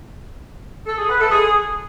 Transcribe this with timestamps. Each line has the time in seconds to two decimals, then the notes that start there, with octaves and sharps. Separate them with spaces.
0.87 A4
0.98 G#4
1.09 B4
1.20 A4
1.31 G#4